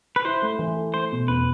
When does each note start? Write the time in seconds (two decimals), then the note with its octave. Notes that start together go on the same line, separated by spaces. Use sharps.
0.16 B4
0.25 E4 C5
0.42 A3
0.59 E3
0.76 A4
0.93 A3 C5
1.12 B2
1.28 E2 B4